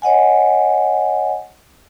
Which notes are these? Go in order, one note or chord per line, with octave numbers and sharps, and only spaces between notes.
C#5 D#5 F#5 G#5